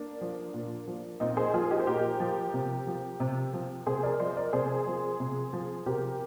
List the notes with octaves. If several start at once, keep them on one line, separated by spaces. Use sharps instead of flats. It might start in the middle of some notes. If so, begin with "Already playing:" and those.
Already playing: A#3 D4
F3
A#2
F3
A#2 C4 D#4
G#4 C5
F3 F4 G#4
D#4 G4
C5
A#2 G4 A#4
F3
C3
F3
C3
F3
C3 G#4 C5
A#4 D5
F3 C5 D#5
A#4 D5
C3 G#4 C5
F3
C3
F3
C3 G4 A#4